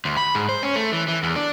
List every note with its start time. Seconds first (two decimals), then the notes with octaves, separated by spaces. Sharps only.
0.05 D2
0.17 B5
0.35 G#2
0.49 C5
0.63 C#4
0.76 A3
0.93 E3
1.08 E3
1.23 E2
1.36 D4